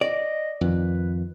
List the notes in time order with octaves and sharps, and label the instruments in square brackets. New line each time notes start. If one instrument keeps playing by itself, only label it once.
[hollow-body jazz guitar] D5 [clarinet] D#5
[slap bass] F2 D#3 [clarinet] B4